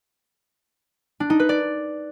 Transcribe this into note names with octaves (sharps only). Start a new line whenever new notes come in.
D4
D#4
B4
D5